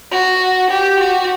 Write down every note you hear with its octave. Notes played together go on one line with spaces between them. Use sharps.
F#4
G4
F#4